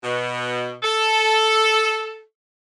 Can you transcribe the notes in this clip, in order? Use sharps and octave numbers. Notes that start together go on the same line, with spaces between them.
B2
A4